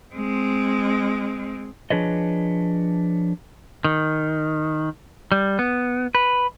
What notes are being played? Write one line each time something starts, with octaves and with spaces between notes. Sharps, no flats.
G#3 C4
F3 D4 G#4 B4 C#5 D#5
D#3
G3
B3
B4